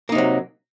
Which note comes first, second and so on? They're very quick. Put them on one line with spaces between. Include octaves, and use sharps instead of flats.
A#3 D#4 C3 F#3